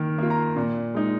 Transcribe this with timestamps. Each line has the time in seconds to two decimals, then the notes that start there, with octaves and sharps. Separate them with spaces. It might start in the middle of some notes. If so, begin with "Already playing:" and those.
Already playing: D#3 A#3
0.18 A#3 F4
0.30 A#5
0.56 A#2
0.94 G#3 D#4